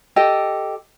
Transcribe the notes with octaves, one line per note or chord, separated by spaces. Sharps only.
G4 A4 D#5 G5